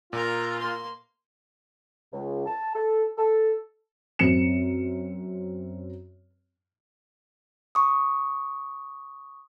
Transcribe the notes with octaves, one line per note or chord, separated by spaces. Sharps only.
A#2 F4 A#4 A#5
A#3 C6
C#2
A5
A4
A4
F#2 C4 C#7 E7
C#6 D#6